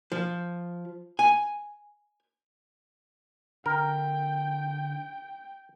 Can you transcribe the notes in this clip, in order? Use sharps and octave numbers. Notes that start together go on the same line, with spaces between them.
F3
G#5
D3 A#4 G5